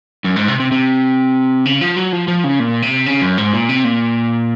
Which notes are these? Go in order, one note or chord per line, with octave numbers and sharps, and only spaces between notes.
F#2
G#2
C3
C3
C3
C#3
F3
F#3
F3
F3
C#3
A#2
C3
C#3
F#2
G#2
A#2
C3
A#2